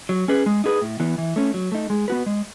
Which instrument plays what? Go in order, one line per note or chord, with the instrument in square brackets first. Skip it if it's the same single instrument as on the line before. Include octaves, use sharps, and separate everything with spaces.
[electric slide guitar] F#3
C#4 G#4 B4
G#3
D#4 G#4 B4
A2
E3 B3
E3
A3 C#4
F#3
A3 D#4
G#3
B3 F#4 B4
G#3